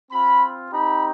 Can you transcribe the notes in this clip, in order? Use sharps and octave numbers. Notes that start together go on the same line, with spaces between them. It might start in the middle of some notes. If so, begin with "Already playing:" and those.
C4 F4 B5
C4 D#4 G4 B5